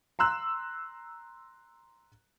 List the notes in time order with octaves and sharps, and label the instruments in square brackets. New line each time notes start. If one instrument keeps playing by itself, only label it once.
[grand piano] A#5 C6 E6 F#6